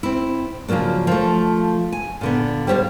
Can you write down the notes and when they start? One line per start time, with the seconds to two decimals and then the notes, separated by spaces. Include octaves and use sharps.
0.03 C4 E4
0.68 C#3 F3 F#3 A#3 D4
1.07 F3 A3
1.92 G#5
2.21 A#2 D3 B3
2.67 G3 C5 C#5 E5 F5